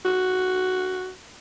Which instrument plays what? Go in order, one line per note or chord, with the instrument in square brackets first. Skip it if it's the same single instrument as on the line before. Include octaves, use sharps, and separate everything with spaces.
[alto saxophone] F#4